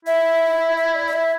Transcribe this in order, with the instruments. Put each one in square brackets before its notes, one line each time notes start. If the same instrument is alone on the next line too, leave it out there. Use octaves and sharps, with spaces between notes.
[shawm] E4 [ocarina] E5
[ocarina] E5
D5
D5
E5